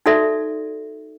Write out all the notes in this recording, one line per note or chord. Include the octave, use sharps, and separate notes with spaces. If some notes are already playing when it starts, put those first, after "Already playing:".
D#4 F#4 A4 D5 E5